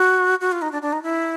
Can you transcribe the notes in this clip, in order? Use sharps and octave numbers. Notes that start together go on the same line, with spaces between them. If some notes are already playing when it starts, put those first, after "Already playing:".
Already playing: F#4
F#4
F4
D#4
D4
D4
D#4
E4